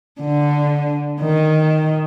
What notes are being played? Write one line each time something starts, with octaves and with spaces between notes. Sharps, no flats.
D3
D#3